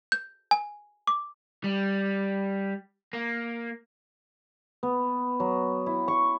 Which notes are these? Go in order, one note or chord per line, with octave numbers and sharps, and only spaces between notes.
G6
G#5
D6
G3
A#3
B3
F#3
E4
C#6